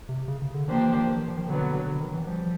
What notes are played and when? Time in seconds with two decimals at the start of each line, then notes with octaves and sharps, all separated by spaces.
0.09 C3
0.28 C#3
0.42 C#3
0.54 D3
0.68 D#3 F3 A#3 D4 G4 C5
0.81 E3
0.95 D#3
1.07 D#3
1.17 E3
1.28 F3
1.37 D#3
1.47 B2 D3 F#3 B3 D4
1.87 D3
2.01 D#3
2.14 E3
2.27 F3 G3